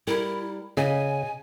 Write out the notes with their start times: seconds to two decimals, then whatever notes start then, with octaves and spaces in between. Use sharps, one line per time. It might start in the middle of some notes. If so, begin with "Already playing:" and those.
0.07 G3 E4 A#4
0.77 C#3 D#5 G#5